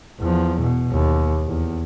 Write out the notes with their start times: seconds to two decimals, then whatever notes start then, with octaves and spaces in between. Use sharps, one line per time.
0.20 E2 F3
0.61 B2
0.92 D#2
1.47 E2